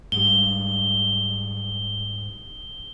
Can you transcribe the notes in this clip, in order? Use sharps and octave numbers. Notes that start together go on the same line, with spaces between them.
G#2 G3 G7